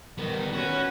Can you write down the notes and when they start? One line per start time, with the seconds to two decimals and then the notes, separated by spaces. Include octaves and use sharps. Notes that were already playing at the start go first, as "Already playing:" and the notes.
0.18 D#3 G3 B3
0.52 C#4 F#4 B4